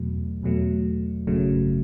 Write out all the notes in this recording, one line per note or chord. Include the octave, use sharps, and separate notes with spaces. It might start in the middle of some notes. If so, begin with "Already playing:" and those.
Already playing: E2 B2 F#3 A3
E2 B2 F#3 A3
G#1 F#2 C#3 F#3 A3